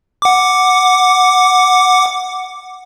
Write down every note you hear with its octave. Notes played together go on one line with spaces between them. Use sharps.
F#5 D6